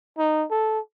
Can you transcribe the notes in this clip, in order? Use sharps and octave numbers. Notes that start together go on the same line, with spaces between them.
D#4
A4